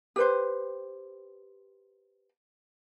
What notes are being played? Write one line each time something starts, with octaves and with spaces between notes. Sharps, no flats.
G4 B4 C5